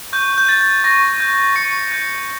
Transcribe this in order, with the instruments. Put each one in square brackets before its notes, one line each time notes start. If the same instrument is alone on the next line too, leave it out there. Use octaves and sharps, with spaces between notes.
[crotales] C#6 G6
G6
G6 A6
C#6 A#6
G6
C#6 C#7
G6